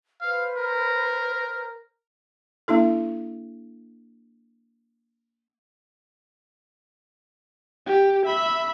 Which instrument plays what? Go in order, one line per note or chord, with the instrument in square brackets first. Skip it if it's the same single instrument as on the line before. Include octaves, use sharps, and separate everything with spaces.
[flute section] B4 C5 [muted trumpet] F5
[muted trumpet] A#4
[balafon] A#3 D4 E4 A4
[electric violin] G4
E5 B5